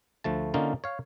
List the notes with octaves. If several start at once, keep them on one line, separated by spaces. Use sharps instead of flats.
D2 F3 A3 A5
D3 A#3 C#4 D#4 F4
C#5 F5